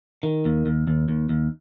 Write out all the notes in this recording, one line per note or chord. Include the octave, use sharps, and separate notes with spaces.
D#3
D#2
D#2
D#2
D#2
D#2